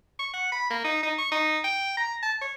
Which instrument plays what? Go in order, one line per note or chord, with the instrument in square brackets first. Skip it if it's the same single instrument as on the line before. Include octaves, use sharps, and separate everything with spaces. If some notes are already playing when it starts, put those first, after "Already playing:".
[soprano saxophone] C#6
F#5
B5
A#3
D#4
D#4
C#6
D#4
G5
A#5
A5
C#5